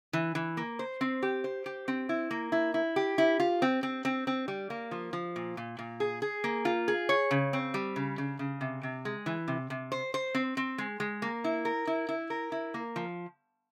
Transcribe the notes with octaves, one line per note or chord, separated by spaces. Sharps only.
E3
E3
A#3
C5
C4
G4
C5
G4
C4
E4
A#3
E4
E4
G4
E4
F4
C4
C4
C4
C4
G3
A#3
F3
F3
A#2
A#2
A#2
G#4
G#4
A#3
F4
G#4
C#5
C#3
C4
G3
C#3
C#3
C#3
C3
C3
G#3
E3
C3
C3
C5
C5
C4
C4
G#3
G#3
A#3
E4
A#4
E4
E4
A#4
E4
A#3
F3